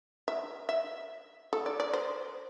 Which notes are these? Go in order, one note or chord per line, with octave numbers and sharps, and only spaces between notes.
E5
E5
A4
D5
D5
C5